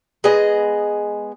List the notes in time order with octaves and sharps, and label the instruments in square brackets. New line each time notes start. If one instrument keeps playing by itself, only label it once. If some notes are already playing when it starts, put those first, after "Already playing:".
[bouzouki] G#3 B3 G#4 D#5